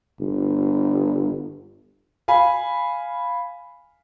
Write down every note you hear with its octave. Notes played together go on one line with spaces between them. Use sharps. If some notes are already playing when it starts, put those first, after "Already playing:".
G1
F5 G#5 B5